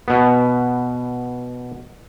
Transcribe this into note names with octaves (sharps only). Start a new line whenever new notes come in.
B2 B3